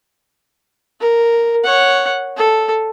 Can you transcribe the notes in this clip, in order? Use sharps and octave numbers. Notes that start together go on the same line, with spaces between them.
A#4
C#5 F#5
A4